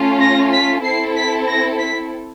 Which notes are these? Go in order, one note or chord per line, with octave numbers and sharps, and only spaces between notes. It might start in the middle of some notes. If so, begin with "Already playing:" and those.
Already playing: A3 C#4 F4
A#6
B6
C4 E4 A4 C7
B6
A#6
B6